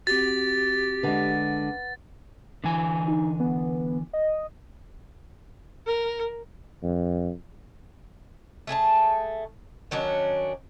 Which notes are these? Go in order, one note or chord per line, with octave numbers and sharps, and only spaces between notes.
C4 F#4 G4 A6
D3 G#3 B4 F#5
D3 E3 G#5
D#4
B3
D#5
A#4
F2
A3 G#4 G#5 A5
D#3 F#3 C#4 D4